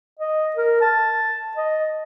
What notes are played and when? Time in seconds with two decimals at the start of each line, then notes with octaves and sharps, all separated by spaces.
0.20 D#5
0.56 A#4
0.81 A5
1.57 D#5